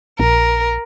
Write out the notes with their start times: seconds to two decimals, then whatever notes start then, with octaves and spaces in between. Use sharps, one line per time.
0.19 A#1 A#4